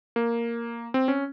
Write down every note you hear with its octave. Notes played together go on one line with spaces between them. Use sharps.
A#3
C4
C#4